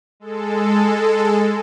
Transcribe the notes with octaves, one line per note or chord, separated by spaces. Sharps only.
G#3 A4